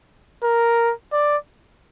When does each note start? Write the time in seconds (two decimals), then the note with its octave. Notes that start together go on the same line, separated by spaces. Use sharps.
0.44 A#4
1.12 D5